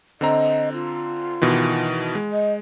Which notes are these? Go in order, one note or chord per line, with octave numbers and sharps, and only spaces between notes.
D3 C4 D#5 A#5
F4
B2 D#3 E3
G#3
D#5